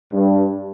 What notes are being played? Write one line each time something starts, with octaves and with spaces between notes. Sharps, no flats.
G2